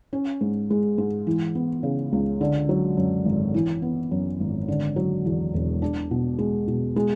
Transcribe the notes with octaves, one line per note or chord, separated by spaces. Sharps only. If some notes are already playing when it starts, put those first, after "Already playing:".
C#4
G#2
G#3
G#2
E3
B3
C#3
C#2
D3
F#3
F#2
G#1
E3
B3
F#2
G#1
D3
F#3
E2
E1
D4
B2
G#3
B2
G#3